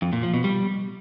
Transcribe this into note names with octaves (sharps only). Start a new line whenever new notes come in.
F2
A#2
F3
B2
G3